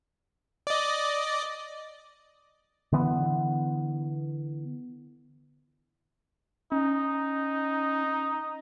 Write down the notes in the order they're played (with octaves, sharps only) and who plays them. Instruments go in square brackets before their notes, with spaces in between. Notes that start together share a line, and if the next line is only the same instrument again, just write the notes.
[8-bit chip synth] D5 D#5
[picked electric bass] D3 E3 B3
[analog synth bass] C#4 [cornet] D#4